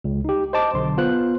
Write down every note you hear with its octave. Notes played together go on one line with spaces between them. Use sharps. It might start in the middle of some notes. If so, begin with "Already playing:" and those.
C#2
D#4 G4
C5 D#5 A5 D6
B1 D3 C6
B3 F4 C5 F#6